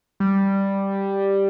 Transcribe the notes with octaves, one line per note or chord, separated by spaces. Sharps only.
G3